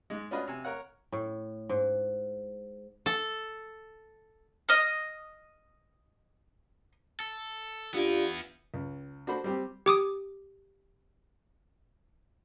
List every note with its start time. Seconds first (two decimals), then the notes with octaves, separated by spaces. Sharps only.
0.10 G#2 G#3
0.31 C#4 D4 F4 F#4 B4 D#5
0.47 C3 G#5
0.65 A#4 C#5 F#5
1.12 A2
1.69 G#2
3.06 A4
4.69 D#5 D#6 F6
7.20 A4
7.94 B3 D4 E4 F4 G4
8.74 C#2
9.27 D4 F#4 A4 C5 B5
9.44 G3 C4 G4
9.86 G4 D6 D#6